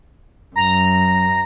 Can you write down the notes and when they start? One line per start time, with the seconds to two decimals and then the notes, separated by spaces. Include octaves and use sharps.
0.56 F#2 A#5